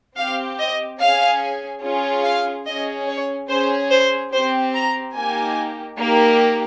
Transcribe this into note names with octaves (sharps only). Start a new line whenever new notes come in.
C4 G4 F5
D#5
C#4 G#4 F5
C#4 F4 G#4
F5
C#4 G#4 D#5
C#5
C#4 G#4 C5
C5
C4 G4 C5
A#5
A#3 D#4 G4 G#5
A#3 D#4 G4